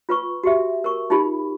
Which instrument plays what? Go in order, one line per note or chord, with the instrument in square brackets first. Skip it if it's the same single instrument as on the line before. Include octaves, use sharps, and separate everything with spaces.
[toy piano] F4 B4 C#6
F#4 G4 E5
A#4 C#6
D#4 F4 G4 B5